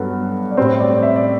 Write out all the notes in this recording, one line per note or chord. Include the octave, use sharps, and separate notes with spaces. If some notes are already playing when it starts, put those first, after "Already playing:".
Already playing: G2 F#3 B3 A4
D5
A2 G3 C4 C5
D5
E5
D5